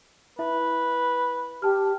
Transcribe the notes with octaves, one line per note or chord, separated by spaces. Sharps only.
E4 B4 E5
G4 G5 A5 F6